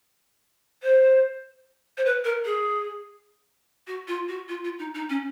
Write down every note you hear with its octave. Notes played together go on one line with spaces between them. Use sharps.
C5
C5
B4
A#4
G#4
F#4
F4
F#4
F4
F4
D#4
D#4
C#4